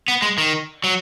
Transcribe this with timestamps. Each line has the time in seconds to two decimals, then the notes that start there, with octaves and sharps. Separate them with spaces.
0.08 B3
0.22 G#3
0.38 D#3
0.84 F#3